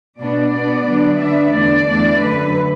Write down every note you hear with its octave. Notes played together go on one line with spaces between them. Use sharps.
B2 B3 D4 D5
B2 B3 D4
D3 F#3 B3 D4
D3 B3 D4 E5
E2 D3 A3 D4 D5
E2 E3 A3 D4 D5
F#2 D3 A3 B4